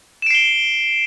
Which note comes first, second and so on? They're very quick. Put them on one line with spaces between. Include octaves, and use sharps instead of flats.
E7 D7 C7 G7